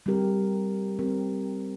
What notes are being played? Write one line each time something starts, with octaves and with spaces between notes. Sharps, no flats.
G3 C4 G4 A#4
G3 C4 G4 A#4